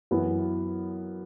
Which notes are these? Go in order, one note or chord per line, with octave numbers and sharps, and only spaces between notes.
F#2 E3 B3 E4 B4